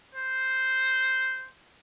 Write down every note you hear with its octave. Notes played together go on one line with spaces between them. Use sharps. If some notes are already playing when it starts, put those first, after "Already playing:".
C5